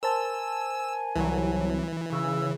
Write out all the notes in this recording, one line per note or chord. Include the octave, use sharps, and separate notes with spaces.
A#4 C5 G#5 A5 E6
C2 E3 F#3
C#3 E6